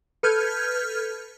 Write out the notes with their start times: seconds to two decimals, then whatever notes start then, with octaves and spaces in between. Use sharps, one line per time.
0.23 A4 B4 F6 G6 G#6